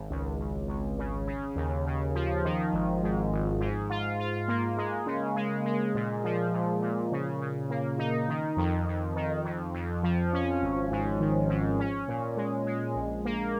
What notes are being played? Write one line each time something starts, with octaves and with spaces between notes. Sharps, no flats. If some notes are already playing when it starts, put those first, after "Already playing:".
Already playing: G#1
C#2
C#2
C#2
C#3
C#3
D#2
C#3
F3
D#3
G#1
G#2
G#1
G#2
F4
F4
A#3
G#3
C#3
G#3
G#3
A#2
F3
A#2
A#2
C#3
C#3
A#3
D#4
D#3
F2
F2
D#3
F2
F2
F3
C#4
G#1
G#2
D#3
G#2
C#4
A#2
G#3
G#3
A#1
A#3